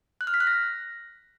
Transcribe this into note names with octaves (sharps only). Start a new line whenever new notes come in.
F#6
F6
B6
F#6
A#6